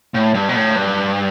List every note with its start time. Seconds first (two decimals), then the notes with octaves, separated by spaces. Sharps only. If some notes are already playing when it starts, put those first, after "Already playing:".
0.14 A2
0.34 G2
0.49 B2
0.55 A2
0.76 G2